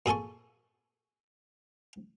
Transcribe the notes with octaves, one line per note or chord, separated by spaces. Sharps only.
A#2 G#4 A4 G#5 C#6